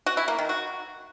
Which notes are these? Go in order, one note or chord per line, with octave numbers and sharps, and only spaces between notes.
F#4
E4
A#3
D#3
F#4